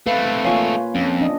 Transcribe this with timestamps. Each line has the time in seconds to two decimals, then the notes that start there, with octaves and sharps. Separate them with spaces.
0.07 A3 C4 B4 F5
0.45 A#3 F4 C#5 F5 G#5 C#6
0.95 F2 C#4
1.21 D4 D#5